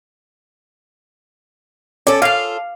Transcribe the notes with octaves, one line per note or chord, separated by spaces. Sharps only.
C#4 A4 D5
F4 A4 F5